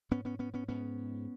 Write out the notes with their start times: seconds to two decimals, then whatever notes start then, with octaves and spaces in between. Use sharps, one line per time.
0.11 G#2 B3 C#4
0.25 B3 C#4
0.39 B3 C#4
0.54 B3 C#4
0.68 G#2 B3 C#4